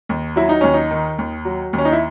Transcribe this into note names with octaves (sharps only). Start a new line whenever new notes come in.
D#2
F#3 E4
D#4
D#2 C#4
D#4
D#3
D#2
F#3
D#2
C#4
D#4
E4